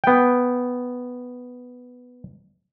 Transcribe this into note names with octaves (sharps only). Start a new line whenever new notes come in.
B3 G5